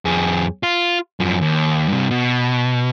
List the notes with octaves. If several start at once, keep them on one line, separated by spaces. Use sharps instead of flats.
F2 G#4
F4
F#2 F3
D#2
G2 C3
B2